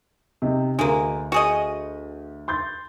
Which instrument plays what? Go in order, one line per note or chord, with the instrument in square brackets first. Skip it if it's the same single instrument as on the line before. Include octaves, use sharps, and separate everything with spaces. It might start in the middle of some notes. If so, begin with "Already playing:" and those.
[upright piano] C3 D#4
[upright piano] D2 [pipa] G#3 A#3
[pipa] F#4 G#4 D#5
[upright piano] C6 G6 A6